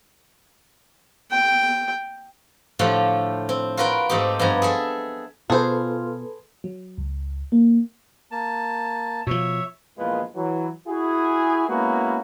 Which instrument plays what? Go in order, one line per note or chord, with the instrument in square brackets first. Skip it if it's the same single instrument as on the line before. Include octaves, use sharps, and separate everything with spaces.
[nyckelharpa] G5
[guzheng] A2 D3 F3 A3 F4 G4
C4
F4 F#4 A#4 B4 G5
G#2 A3 C4 D#4 G4
G2 F3 B3 G#5 A#5
G#4 A4 E5
[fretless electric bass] B2 [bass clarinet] F4 [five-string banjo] G#4 C5 [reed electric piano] A4 B4
[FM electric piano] F#3
C#2
A#3
[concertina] A#3 A5
[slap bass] B2 F3 [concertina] C#5 E5
[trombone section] A#1 E2 D#3 G#3 F4 B4
E3 F#3
E4 F#4 G#4
G#3 A#3 B3 C#4 E4 F#4